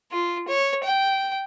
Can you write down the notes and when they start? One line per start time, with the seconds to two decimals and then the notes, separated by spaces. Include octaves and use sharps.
0.11 F4
0.48 C#5
0.84 G5